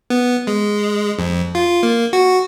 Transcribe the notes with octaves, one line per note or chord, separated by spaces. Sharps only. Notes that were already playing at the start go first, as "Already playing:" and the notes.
B3
G#3
F2
F4
A#3
F#4